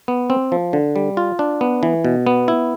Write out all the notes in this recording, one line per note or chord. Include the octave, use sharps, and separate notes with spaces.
B3
C4
F3
D3
G3
F4
D4
B3
E3
B2
B3
E4